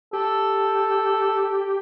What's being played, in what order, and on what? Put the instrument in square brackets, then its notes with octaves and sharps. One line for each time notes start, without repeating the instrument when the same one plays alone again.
[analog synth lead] G4 [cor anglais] A4